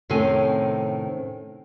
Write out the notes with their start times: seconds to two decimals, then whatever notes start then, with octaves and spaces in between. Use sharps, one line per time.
0.10 A2 C3 D#3 C#4 C5 G#5